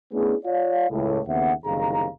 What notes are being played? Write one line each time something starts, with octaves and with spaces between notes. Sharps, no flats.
A3 B3 C#4 D4 E4 G#4
F4 C#5 D5 F5
C#2 A2
D#2 C#3 B3 C4 E5 F#5
F#1 C2 D#3 G#4 F5 A#5